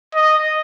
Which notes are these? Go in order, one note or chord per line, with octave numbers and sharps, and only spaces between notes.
D#5